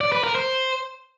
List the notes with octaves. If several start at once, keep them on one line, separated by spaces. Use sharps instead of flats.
D5
B4
A#4
C5